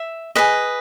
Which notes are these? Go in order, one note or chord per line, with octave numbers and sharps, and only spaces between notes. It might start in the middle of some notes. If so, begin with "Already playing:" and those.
Already playing: E5
G#4 B4 D#5